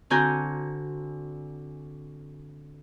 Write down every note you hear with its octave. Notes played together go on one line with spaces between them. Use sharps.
D3 C4 F#4 G#5 A#5 G6